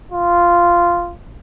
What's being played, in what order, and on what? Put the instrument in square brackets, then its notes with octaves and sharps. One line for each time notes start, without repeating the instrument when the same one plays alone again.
[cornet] F4